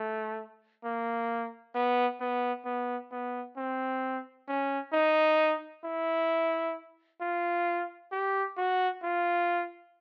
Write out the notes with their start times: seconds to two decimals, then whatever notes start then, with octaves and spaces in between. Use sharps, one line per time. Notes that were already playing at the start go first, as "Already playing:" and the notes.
Already playing: A3
0.84 A#3
1.75 B3
2.20 B3
2.66 B3
3.11 B3
3.57 C4
4.48 C#4
4.93 D#4
5.84 E4
7.21 F4
8.12 G4
8.57 F#4
9.03 F4